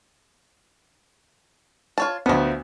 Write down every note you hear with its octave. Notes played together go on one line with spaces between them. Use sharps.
F4 C#5 A5
D2 F3 A3 B3